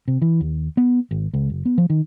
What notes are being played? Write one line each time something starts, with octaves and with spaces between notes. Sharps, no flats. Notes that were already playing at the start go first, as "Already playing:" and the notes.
C3
E3
D#2
B3
G#1
C#2
F#1
B3
F3
D#3